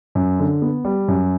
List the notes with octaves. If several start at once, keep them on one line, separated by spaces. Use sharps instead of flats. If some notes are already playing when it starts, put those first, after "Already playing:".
F#2
D3
B3
G3
F#2